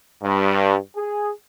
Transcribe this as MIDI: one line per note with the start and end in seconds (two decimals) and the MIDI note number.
0.23 0.77 43
0.96 1.30 68